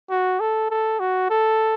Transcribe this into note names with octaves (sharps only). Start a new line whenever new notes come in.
F#4
A4
A4
F#4
A4